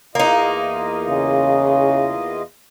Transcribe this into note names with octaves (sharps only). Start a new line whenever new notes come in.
E2 A#3 D#4 F4 D#5
C#3